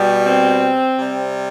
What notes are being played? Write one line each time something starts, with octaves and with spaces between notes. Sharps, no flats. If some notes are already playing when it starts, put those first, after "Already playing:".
Already playing: B2 G3
C4
C3 G3